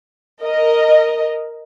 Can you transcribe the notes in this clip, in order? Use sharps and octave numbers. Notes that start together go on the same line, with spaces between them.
A#4 D#5